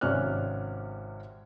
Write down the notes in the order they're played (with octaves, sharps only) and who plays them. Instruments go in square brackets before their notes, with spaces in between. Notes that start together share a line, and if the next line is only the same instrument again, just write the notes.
[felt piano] G#1 C3 C#4 D5 F6 F#6